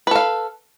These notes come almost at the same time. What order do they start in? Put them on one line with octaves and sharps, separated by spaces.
B4 A4 F5